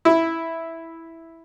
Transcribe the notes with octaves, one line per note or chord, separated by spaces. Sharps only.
E4